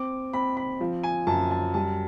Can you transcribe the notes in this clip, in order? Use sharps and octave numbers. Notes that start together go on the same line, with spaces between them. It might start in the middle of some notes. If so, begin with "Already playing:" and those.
Already playing: C4 D6
C4 B5
B5
F3
G#5
F#2 A5
A5
G3 A5